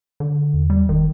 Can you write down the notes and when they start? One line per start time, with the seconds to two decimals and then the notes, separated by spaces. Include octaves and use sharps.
0.20 D3
0.54 E2
0.70 G3
0.89 F#1 D#3